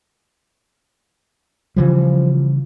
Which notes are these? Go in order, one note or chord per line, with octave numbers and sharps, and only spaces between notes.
C#3 E3 F3 G3